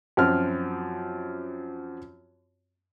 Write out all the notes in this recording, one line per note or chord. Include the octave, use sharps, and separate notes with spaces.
F#2 F3 C4 F6